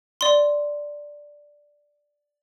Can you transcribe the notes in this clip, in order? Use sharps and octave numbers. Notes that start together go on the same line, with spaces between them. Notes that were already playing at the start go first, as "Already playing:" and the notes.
D5 C6